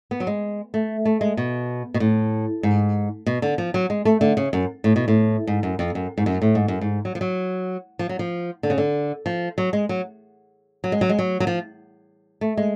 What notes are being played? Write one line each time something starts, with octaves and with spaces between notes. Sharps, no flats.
B3
F#3
G#3
A3
A3
G#3
B2
B2
A2
G#2
B2
D3
F3
F#3
G#3
A3
D3
C#3
F#2
A2
B2
A2
G#2
F#2
F2
F#2
G#2
F#2
A2
G#2
F#2
G#2
F#3
F3
F#3
F3
F#3
F3
D3
C#3
D3
F3
F#3
G#3
F#3
F#3
G#3
F#3
G#3
F#3
F#3
F3
A3
G#3